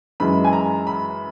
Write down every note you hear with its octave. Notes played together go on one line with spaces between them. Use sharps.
F#2 E3 G#3 B5
G#5
A#5
B5